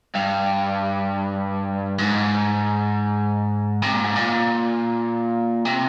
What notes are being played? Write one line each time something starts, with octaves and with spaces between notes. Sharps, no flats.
G2
G#2
C3
A#2
G#2
A#2
C3